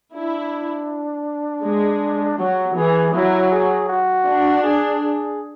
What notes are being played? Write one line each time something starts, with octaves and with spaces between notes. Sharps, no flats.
D4 E4
G#3
F#3 F#4
E3 G#4
F#3 E4
G#4
F#4
D4
G#4
G#4